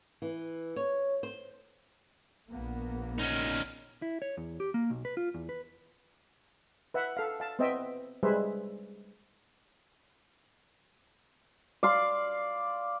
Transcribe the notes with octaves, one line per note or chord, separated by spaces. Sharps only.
E3
C#5
C5
A#1 A#3 B3
C#4 D#4
E4
C#5
E2
G4
A#3
B1
B4
F4
E2
B4
B4 E5 F#5
A4 F5
F5 A5
B3 C4 C5 D#5 E5 G5
G3 G#3 G#4 B4 C5 E5
D5 F5 C6